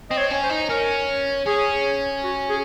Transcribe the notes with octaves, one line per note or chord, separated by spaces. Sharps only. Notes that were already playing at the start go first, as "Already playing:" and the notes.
C4 D#5
C#5
C#4
C5
D#4
C#4 A#4
C#4 G#4
F#4
G#4